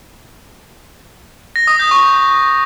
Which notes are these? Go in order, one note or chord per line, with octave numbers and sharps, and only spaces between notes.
A#6
D#6
G6
C#6